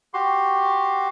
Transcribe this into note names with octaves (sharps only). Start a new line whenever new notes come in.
F#4 G4 C6